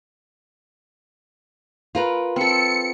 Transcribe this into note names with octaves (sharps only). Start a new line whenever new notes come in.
F4 A#4 B4
C4 A4 C#7